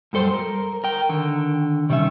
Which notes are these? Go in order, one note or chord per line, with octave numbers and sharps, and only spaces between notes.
F#2 G3 A4 C5
A#4
A#4 G5
D3 D#3
C3 D#3 G3 C#4 E5